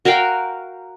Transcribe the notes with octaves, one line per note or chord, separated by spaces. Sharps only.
F#4 A#4 F5 G5